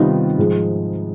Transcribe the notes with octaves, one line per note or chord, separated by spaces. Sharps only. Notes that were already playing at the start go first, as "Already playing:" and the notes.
Already playing: C3 D#3 G3 B3 D#4 F4
G#2 F3 G#3